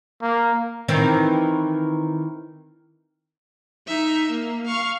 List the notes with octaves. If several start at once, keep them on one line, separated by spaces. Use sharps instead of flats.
A#3
D#3 E3 C4
D#4 E5
A#3
F5 C#6